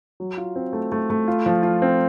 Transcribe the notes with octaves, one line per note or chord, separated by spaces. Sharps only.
F#3
F4
C4
A3
A3
A3
F4
F3
F4
C4